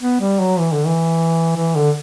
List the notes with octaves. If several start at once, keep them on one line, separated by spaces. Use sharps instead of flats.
B3
G3
F#3
E3
D3
E3
E3
D3